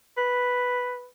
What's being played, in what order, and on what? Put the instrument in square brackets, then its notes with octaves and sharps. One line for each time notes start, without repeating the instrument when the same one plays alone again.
[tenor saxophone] B4